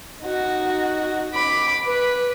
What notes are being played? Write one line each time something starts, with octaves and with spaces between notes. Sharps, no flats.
D#4 F#4
B5 D6
B4